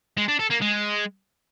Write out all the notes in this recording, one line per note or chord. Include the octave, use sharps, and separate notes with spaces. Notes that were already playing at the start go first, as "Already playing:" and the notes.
G#3
D4
A4
A#3
G#3